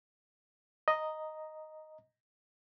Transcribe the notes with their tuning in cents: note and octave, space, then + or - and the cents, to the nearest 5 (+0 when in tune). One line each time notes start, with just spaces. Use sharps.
D#5 +0 A#5 +0